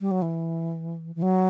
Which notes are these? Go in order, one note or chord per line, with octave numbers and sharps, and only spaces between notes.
G3
F#3
E3
E3
F#3